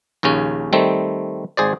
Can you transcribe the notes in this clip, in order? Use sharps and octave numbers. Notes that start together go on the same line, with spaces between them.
A#1 D#2 C#3 C#4
D#3 G3 A3 C4
G#1 G#4 C5 D5